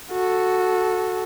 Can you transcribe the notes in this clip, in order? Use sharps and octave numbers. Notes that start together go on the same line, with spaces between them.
F#4 A4